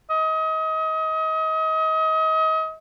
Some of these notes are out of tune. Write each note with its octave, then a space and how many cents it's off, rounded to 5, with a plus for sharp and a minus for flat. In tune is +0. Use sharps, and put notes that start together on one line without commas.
D#5 +30